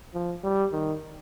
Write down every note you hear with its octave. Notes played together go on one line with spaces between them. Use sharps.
F3
G3
D#3